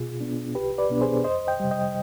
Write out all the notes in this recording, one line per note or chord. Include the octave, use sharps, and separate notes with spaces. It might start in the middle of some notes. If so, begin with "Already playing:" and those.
Already playing: B2 F4 G#4
B3 D4
C2 G4 B4
B4 D5
B2 B3 D4
G#4 C5
F2 C5 D#5
D#5 G5
C3 G3
D#5 G5